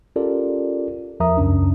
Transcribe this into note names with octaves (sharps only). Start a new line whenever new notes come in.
C#4 F4 G4 A4 A#4 D5
E2 F3 A#4 E5 A#5 D#6
C#2 F#2 C#3 C#4 D4